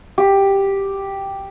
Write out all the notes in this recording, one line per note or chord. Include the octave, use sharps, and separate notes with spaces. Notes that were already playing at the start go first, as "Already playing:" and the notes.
G4